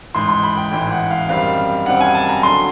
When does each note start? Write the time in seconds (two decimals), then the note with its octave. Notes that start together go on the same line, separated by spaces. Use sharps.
0.15 A1 G#2 E3 C6
0.29 C6
0.43 B5
0.57 G5
0.72 A1 G#2 E3 G5
0.92 F#5
1.10 F5
1.29 F#2 D#3 G3 C4 F5
1.86 F#2 D#3 G3 C4 F#5
2.01 G#5
2.15 A5
2.29 A#5
2.43 D3 F#3 C6